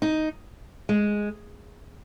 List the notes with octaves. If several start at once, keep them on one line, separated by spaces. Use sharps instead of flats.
D#4
G#3